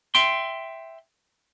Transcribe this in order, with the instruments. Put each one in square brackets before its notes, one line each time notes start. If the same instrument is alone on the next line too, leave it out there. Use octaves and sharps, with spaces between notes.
[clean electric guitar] E5 G5 C6